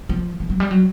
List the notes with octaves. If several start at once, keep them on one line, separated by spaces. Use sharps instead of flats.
F3
E3
F#3
G3
F#3